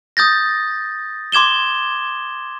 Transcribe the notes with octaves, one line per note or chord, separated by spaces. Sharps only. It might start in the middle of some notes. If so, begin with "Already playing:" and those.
D#6 G6 A6 A#6
C6 D6 G#6 E7 G7